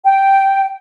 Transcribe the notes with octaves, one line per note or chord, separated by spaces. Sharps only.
G5